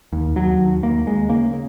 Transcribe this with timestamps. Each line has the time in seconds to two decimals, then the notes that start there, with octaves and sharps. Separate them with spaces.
0.12 D#2
0.36 D#2 F#3
0.59 D#2
0.83 D#2 A#3
1.06 D#2 G#3
1.29 C#3 A#3
1.53 C#3